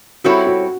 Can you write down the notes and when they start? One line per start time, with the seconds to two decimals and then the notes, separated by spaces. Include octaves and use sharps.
0.24 G3 C4 E4 F#4 A4 C#5
0.46 F#4